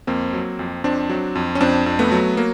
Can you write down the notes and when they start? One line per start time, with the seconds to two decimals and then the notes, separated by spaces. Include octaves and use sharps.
0.07 F2 A#3 C4
0.33 F#3
0.59 F2
0.84 F2 C4 D4
1.09 F#3
1.35 F2
1.55 C#4
1.61 F2 C4 D4
1.86 F2
1.99 A3 B3
2.11 F#3
2.37 F#3 A#3